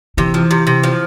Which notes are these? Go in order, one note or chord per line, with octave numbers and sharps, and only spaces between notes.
C3 E3
F3
C3
C3
F3